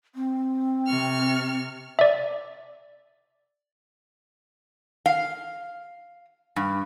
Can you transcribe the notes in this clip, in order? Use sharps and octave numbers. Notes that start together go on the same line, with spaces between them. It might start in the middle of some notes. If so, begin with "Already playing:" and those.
C4
C3 C#6 F6
D5 E5
F5
G2